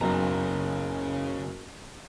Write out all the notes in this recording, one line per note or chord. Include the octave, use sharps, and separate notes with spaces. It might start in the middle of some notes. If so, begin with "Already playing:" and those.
F#1 B1 C#3 A#5